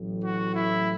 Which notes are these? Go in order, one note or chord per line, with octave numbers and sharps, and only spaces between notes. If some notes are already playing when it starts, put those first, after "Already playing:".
Already playing: A1 A2 F#3
F#4
E4